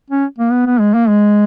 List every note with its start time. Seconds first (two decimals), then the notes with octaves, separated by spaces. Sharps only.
0.10 C#4
0.38 A#3
0.52 B3
0.66 B3
0.80 G#3
0.94 A#3
1.09 G#3